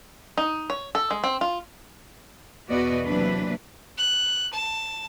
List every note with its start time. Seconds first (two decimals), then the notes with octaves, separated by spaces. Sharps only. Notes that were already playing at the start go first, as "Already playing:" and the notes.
0.37 D#4
0.70 C#5
0.95 A4
1.11 G#3
1.24 C4
1.41 F4
2.69 E2 B2 F#4 B4 D5 D#5
3.05 C3 E3 F#3 A#3 D4 B4
3.97 F#6
4.53 A5